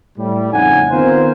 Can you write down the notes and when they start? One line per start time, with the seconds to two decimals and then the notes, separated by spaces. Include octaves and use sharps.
0.18 A2 G3
0.52 F2 C#3 D#4 F#5 G#5
0.91 D#3 B3 C4 F4 A#4 C5